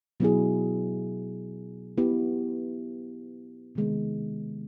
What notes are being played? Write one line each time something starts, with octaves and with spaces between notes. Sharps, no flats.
B2 F#3 B3 E4 G#4
B3 E4 G4
C3 D#3 G#3 B3